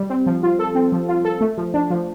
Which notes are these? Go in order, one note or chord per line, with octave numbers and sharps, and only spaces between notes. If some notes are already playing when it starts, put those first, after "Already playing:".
Already playing: G3
C4
F3
F4
A4
C4
F3
F4
A4
A3
F3
D4
F3